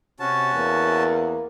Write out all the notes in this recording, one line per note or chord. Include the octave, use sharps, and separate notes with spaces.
C3 C#4 F#4 A5
E2 A#3